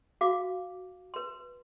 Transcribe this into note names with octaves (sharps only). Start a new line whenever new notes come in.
F#4 F5 D6
B4 C6